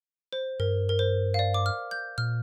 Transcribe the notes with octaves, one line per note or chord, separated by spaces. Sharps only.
C5
G2 A#4
A#4
C5
F5
D5
D6
F6
G6
A#2 F6